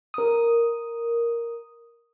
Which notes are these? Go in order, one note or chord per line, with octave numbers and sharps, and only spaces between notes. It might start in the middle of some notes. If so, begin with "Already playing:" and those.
A#4 D#6